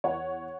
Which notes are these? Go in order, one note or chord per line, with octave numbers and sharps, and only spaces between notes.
E2 C#5 F#5